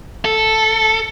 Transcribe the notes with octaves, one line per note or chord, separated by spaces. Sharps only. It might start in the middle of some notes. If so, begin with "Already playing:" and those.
A4